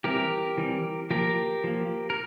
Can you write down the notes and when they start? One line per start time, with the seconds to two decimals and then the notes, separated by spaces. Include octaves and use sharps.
0.04 E3 G3 C4 G4 A#4
0.58 E3 G3 C4
1.10 F3 A#3 G4 A#4
1.64 F3 A#3
2.10 A#4